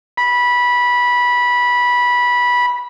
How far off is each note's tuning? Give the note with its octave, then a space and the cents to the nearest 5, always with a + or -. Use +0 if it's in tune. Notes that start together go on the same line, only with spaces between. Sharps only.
B5 -15